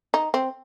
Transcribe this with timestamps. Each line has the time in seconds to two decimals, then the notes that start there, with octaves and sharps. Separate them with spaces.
0.14 D#4
0.34 C4